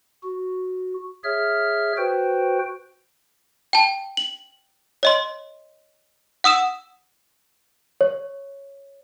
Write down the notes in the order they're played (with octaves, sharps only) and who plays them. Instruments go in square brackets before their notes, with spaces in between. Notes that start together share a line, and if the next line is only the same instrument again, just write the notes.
[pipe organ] F#4
G#4 C#5 E5 F6
F#4 B4 C5 G5
[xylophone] G5 A5
F#7
C#5 D#5 C6
F#5 D#6 E6 E7
[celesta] C#5